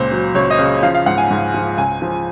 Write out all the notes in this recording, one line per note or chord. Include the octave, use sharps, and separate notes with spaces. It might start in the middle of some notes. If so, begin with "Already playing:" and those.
Already playing: C#2 A#2 C5
F#3
C#2 C#5
D#5
C#3
F3 F5
F5
G#2 F#5
G#5
G#2
F3
C#2 G#5
F3